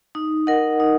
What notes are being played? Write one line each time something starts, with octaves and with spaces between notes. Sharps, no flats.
D#4
A#4 D#5 F#5
D#4